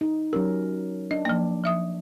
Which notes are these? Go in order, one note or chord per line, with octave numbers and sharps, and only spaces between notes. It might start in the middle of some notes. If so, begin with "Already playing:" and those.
D#4
F#3 C#4 G4 A#4
D4 D#5
F3 A#3
F3 E5 D#6